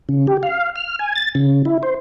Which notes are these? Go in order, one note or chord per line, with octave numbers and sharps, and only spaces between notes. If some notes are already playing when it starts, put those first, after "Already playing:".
C#3
G4
F5
F6
G#5
A6
C#3
E4
C5